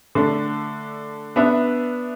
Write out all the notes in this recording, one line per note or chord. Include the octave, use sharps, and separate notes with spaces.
D3 A3 D4
B3 D4 B4 E5